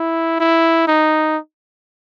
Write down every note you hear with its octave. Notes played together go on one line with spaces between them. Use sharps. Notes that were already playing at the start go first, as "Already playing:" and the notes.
Already playing: E4
E4
D#4